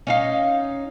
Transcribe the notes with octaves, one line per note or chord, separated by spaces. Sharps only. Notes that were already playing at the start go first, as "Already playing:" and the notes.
C#4 D#4 F5